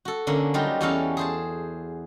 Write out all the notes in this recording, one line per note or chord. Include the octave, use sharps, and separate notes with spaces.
F#4 A4
D3 A#3 C#4 D4
F#3 G3 D#4 F4 G4
E2 G3 C#4 F#4 A4 F5
G#4 C5 A5